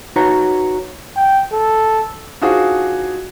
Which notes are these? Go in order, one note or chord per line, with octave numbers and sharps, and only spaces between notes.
D#4 F#4 B4 C#5 F#5 A#5
G5
A4
D4 D#4 F4 F#4 G#4 C5